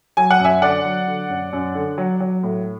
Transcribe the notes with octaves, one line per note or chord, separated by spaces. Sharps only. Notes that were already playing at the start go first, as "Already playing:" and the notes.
F#3 G#5
F#5
F#2 E5 G#5
D3 D5 F#5
F#3
D3
F#2
F#2
D3
F#3
F#3
A2